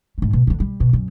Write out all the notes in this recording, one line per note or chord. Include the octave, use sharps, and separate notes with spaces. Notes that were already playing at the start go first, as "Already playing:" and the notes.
G#2 A3
B2
D3 E3
G3
B2
F#2